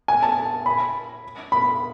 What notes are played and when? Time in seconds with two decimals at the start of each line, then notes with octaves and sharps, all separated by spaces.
0.08 G#5
0.23 A5
0.66 B5
1.52 B5